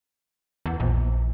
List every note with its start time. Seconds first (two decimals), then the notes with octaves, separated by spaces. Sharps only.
0.66 E2
0.80 A#1